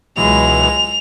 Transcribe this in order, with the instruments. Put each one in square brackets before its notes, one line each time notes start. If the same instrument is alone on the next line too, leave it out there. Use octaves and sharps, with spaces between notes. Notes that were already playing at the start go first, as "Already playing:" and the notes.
[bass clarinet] C#2 [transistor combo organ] B2 E3 F#3 [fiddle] G#3 [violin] F7